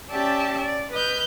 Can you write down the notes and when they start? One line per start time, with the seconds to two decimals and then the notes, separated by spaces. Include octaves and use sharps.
0.11 C#4 G4 D5 E5 G5 A5
0.61 D5
0.92 B4 D#5 F6 G6